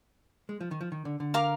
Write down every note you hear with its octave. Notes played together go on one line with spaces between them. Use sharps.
G#3
F3
D#3
F3
D#3
D3
D3
A#4 F5 A#5 D6